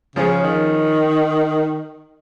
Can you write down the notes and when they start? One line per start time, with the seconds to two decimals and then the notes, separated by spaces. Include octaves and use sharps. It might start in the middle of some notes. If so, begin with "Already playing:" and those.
0.16 C#3 F3 C#4 G#4
0.43 D#3